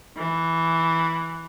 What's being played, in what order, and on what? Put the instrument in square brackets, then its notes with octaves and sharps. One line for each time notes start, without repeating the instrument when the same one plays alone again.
[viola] E3